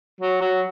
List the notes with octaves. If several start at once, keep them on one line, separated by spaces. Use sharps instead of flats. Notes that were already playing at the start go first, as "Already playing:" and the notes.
F#3
F#3